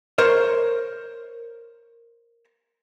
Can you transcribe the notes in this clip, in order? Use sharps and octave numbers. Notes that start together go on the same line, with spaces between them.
A#4 C5 C#5